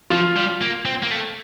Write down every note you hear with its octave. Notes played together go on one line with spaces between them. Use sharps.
F3 F4
G3
A#3
C4
A#3
A3